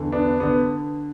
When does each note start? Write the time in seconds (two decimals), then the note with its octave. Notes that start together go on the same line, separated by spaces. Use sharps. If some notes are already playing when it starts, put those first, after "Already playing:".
Already playing: E2 D3
0.12 B3 D4
0.40 D3 B3